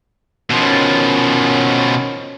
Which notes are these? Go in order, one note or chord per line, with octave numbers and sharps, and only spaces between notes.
B2 D#3 F3 C#4